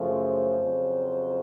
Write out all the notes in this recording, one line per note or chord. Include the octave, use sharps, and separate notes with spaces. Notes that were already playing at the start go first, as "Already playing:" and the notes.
Already playing: F#2 C#3 F3 A3 C5
F2 C#3 F#3